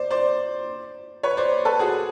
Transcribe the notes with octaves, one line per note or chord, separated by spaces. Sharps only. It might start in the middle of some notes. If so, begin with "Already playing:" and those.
Already playing: C5 D5
C5 D5
B4 C#5
C5 D5
A4 B4
F#4 G#4